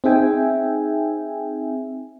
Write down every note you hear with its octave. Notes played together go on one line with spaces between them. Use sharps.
C4 D#4 G#4 E5 G5 G#5